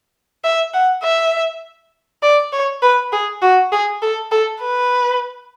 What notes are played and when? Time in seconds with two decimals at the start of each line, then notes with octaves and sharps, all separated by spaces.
0.44 E5
0.74 F#5
1.03 E5
2.23 D5
2.53 C#5
2.82 B4
3.12 G#4
3.42 F#4
3.72 G#4
4.02 A4
4.31 A4
4.61 B4